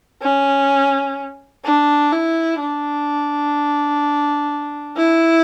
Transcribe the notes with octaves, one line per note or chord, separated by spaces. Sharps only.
C#4
D4
E4
D4
E4